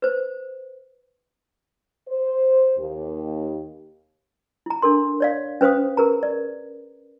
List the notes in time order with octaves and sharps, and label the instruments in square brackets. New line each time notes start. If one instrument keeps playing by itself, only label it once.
[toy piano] B4 C5
[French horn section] C5
D#2
[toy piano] E4 A#5
D4 A4 A#4 C6
C#5 D5 F5
C#4 B4 C5 F5 D#6
G#4 A#4 B4 A#5
D5